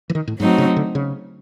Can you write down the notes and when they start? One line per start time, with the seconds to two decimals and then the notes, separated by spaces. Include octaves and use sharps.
0.10 E3
0.15 D#3
0.28 A2
0.40 G#2 F#3 A3 C4 D#4 F#4
0.58 C#3
0.76 D3
0.95 C#3